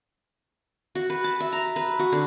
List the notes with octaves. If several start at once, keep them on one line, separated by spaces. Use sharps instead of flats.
F#4
B4
A5
E5
A#5
B4
F#4
D3